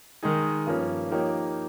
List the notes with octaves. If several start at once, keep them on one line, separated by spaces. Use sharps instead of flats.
D#3 G#3 D#4 G#4
G2 F3 A#3 C#4
F3 A#3 D#4 G4 C#5